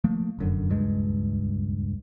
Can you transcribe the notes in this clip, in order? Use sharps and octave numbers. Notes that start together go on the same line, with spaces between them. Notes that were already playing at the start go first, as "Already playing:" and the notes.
F3 A3 A#3
F1 F#2 D3
D#1 C#2 G2 G#3